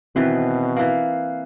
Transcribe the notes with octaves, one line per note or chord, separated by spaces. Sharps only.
B2 D#3 E3 C4 F#4 B4
E3 A#3 F5